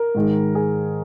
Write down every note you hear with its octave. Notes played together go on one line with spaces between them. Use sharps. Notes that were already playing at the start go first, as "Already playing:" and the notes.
Already playing: A#4
G#2 D#3 G#3
G#4